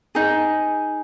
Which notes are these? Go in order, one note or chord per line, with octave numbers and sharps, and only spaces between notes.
D#4 G#4